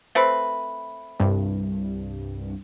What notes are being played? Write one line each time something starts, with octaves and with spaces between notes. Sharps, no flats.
A3 C4 B4
C2 G2